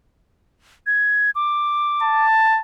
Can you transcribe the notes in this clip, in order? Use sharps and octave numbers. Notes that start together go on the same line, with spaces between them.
G#6
D6
A5